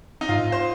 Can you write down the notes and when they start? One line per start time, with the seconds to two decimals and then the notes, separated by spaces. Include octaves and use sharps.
0.21 D#4
0.29 G#2 F4
0.52 C5